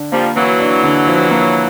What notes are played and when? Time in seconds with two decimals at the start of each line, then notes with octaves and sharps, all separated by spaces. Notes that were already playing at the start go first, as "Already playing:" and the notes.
Already playing: D3 D4
0.12 F3 G3 A#3
0.35 E3 F#3 A#3
0.60 D4
0.83 D3
1.07 F3
1.31 A#3